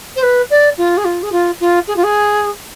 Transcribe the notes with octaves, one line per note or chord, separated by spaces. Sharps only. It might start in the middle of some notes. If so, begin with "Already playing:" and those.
C5
B4
D5
F4
G#4
F4
G#4
F4
F4
G#4
F4
G#4